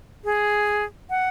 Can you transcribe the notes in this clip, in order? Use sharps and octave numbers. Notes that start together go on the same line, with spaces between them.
G#4
F#5